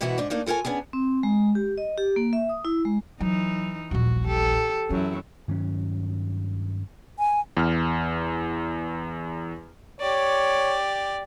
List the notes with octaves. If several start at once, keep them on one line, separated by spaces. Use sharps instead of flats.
G#2 B2 E3 B3 E4 F#4
G#2 D4 D5
A3 A#3 D4 D#4
F4 A4 A#4 C#5 G#5
B3 C#4 D4 G#4
C4
G#3
G4
D#5
G4
A#3
E5
D#6
E4
G#3
E3 F#3 D#4
D#1 A#1 F#4
G4 A4
F#2 E3 E4
G2 D#3 F#3 C#4
G#5
E2 F6
G4 C#5 D5